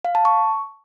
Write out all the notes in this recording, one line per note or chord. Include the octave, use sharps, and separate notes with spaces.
F5
A5
C#6